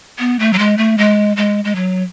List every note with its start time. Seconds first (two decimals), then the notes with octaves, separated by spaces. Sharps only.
0.19 B3
0.39 A3
0.53 F#3
0.59 G#3
0.78 A3
0.98 G#3
1.37 G#3
1.65 G#3
1.75 F#3